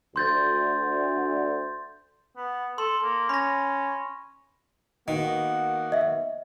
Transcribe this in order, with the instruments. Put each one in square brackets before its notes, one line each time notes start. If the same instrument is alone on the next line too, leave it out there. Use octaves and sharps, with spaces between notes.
[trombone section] D2 [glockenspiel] C6 G6 A6
[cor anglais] B3
[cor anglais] A4 [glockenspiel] C6
[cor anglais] A#3
[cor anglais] C#4 [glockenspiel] B5 A#6
[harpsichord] D#3 [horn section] A#3 B3 F#4
[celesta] D#5 E5